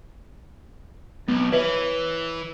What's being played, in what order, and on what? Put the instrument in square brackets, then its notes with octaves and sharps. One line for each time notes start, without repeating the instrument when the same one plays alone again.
[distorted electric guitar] B1 [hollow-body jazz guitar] B3
[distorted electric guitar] E3 [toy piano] B4 [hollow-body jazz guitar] C#5 E5